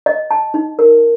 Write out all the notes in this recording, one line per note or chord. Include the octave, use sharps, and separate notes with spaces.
D#5
A5
D#4
A#4